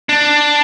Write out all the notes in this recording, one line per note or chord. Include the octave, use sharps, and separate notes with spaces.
D4